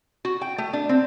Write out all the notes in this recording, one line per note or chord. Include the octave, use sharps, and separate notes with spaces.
F#4
G5
A3
D4
C4